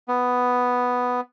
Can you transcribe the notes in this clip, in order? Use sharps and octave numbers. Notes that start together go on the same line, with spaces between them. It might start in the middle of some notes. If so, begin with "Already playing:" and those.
B3